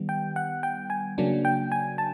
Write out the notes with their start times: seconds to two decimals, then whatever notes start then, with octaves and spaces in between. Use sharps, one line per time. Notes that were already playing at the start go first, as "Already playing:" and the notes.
Already playing: D#3 G3 B3
0.09 G5
0.36 F#5
0.63 G5
0.90 G#5
1.18 C#3 F#3 A#3 D4
1.45 G5
1.72 G#5
1.98 A5